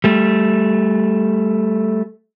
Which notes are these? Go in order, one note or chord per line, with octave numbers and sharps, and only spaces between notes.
G3 A3